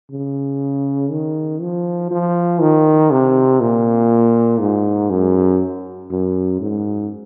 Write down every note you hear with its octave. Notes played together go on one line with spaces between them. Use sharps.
C#3
D#3
F3
F3
D#3
C3
A#2
G#2
F#2
F#2
G#2